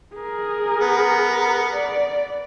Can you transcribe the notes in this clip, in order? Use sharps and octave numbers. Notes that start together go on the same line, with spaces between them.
G#4 A#4
B3
D5